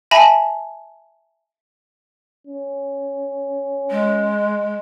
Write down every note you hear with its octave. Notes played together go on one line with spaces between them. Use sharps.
E5 G#5 A5 B5 A#6
C#4
G#3